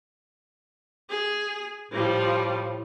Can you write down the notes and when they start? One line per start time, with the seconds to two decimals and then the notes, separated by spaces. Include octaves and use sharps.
1.10 G#4
1.92 A2 F3 G3